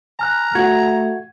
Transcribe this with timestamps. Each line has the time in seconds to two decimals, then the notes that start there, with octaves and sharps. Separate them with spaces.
0.19 G#5 A#5 F6 F#6
0.55 A3 F#4 G#6